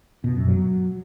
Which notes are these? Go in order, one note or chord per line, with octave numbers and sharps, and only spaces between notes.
B2
F#2
F#3